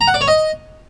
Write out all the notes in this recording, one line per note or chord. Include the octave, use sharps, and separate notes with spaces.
A#5
F#5
D5
C#5
D#5